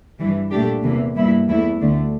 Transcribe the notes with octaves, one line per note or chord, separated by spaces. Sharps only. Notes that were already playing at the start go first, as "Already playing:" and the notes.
G2 E3 G3
A#2 A3 D4 G4
E2 C3 E3 A#3
G2 E3 G3 A#3 E4
E2 E3 A3 E4
D2 D3 A3 D4